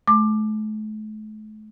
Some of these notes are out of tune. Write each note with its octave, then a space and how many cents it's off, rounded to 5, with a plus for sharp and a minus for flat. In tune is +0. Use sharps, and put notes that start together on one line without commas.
A3 -40 D6 +20